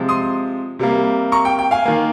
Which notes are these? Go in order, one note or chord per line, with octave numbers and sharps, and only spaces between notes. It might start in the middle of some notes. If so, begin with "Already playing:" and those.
Already playing: C3 F3 G#3
C6 D#6
C3 G3 A#3
A#5 C#6
G5
G5
F5 G#5
D#3 A#3